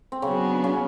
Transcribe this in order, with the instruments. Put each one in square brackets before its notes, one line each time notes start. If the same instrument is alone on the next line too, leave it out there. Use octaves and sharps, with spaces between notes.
[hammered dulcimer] C4
[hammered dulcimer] C#3 C#4 [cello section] F#3 B3 D4 F#4
[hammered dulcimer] C#3 C#4